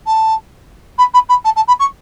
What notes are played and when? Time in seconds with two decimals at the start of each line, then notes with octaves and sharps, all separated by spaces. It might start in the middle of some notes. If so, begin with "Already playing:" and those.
0.06 A5
0.98 B5
1.13 B5
1.29 B5
1.44 A5
1.55 A5
1.67 B5
1.79 C#6